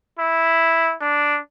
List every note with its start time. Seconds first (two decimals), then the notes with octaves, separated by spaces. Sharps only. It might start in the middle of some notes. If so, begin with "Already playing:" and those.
0.19 E4
1.01 D4